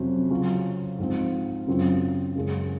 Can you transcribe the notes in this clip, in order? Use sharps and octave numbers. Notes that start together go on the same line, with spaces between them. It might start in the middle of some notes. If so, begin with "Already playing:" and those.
Already playing: F2 C3 F#3 C#4 F#4
C#3 F#3 C#4 F4
G#2 F3 C4
F#2 C#3 F#3 C4 F4
F#2 C#3 G#3